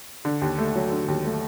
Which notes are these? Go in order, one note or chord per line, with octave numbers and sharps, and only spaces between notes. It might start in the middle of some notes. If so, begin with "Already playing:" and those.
D3
D#2
A3
F#3
D3
D#2
A3